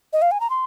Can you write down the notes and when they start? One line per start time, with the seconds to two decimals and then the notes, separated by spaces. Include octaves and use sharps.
0.13 D#5
0.22 F5
0.31 G#5
0.40 A#5
0.50 C6